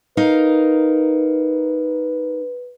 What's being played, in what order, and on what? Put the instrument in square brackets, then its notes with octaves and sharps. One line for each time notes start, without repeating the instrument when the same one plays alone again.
[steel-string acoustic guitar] D#4 A#4 F5 [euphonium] B4